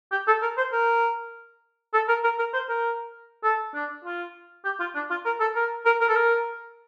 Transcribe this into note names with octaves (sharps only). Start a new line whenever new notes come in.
G4
A4
A#4
C5
A#4
A4
A#4
A#4
A#4
C5
A#4
A4
D4
F4
G4
F4
D4
F4
A#4
A4
A#4
A#4
A#4
A4
A#4